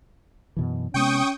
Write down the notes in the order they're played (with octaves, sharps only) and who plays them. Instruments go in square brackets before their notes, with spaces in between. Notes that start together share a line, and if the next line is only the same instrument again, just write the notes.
[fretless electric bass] F#2 B2 E3
[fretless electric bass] C3 G#3 B3 [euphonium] C#4 [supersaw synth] G5 C#6 D#6